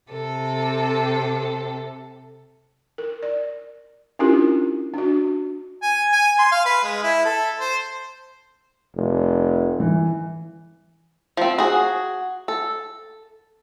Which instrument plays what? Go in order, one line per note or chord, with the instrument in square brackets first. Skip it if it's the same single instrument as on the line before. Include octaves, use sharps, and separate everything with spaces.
[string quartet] C3 A4
[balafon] A#4
D5
C#4 D4 E4 F4 G4 A#4
D4 F#4
[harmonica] G#5
G#5
C6
F5
B4
G#3
E4
A4
C5
[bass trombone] F1
[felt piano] E3
[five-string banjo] F3 C4
F#4 G#4
A4